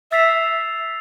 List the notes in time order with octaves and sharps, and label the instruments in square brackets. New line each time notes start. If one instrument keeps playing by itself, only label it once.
[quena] E5 [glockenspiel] E6 A6 C7 F7